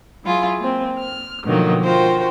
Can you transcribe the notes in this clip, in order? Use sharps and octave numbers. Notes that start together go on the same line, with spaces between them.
F#3 E4 F4 G#4
A#3 C4
F6
B2 D3 D#3 F3 F#3 A#3
F4 F#4 A#4 C5 G5